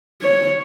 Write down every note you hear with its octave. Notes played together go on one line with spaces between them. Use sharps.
C#5